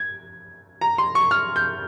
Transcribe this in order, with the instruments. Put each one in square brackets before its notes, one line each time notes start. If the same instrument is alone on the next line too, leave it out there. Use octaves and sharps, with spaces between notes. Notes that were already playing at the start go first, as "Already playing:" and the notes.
Already playing: [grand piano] G#6
A#5
C6
C#6
F6
G6